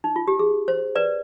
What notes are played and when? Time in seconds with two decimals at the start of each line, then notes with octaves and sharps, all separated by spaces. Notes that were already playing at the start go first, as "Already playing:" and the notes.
0.04 D#4
0.16 F4
0.28 G4
0.39 G#4
0.68 C5
0.95 B4 D5